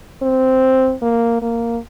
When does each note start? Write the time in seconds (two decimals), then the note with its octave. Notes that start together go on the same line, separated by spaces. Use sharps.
0.22 C4
1.02 A#3
1.42 A#3